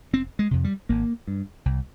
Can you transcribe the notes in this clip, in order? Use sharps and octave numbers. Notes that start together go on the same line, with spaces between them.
F1 C4
G#3
F2 C3
G3
G#1 A#3
G2
C2